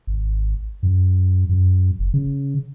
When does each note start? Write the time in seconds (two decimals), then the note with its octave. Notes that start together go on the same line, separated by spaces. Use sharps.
0.07 G#1
0.83 F#2
1.49 F#2
1.99 F#1
2.14 C#3